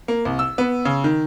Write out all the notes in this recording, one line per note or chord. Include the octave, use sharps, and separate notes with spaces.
A#3
C2
E6
B3
C#3
D#3